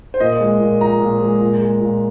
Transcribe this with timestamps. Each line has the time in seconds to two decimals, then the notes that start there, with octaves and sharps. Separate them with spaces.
0.14 C5
0.20 A#2 D#5
0.40 G#3
0.60 A#2
0.81 F3 A#5
1.01 A#2
1.21 G#3
1.41 A#2
1.61 G#3
1.81 A#2